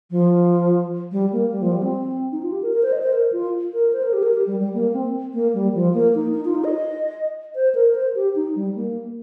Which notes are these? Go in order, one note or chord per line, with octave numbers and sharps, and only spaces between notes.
F3
G3
A#3
G3
F3
G3
C4
D#4
F4
G4
A#4
A#4
C5
D#5
C5
A#4
F4
A#4
C5
A#4
G4
A#4
G4
G3
G3
A#3
C4
A#3
G3
F3
A#3
D#4
D#4
F4
D#4
D#5
C5
A#4
C5
G4
D#4
G3
A#3